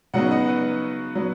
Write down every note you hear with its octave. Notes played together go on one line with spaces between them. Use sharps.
C#3 F#3 B3 D#4 F#5
D#5
B4
F#3 B3